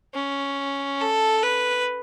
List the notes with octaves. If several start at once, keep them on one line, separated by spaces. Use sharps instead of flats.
C#4
A4
B4